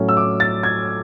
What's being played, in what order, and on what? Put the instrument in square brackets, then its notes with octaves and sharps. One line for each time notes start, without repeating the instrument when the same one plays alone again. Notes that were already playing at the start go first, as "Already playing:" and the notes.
Already playing: [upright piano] A2 F#3 C#4
E6
D6
A6
G#6